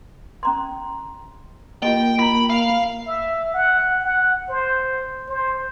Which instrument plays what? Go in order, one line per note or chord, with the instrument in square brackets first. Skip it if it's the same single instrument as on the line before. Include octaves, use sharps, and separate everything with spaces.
[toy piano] C#4 A#5 C6
[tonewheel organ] A#3 [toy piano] F4 G4 D#5 [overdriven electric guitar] G5
[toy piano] F4 A#5 [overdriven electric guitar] B5
[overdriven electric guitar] F5
[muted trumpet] E5
F#5
F#5
C5
C5